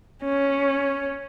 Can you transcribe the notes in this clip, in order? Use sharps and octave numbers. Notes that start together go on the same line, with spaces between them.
C#4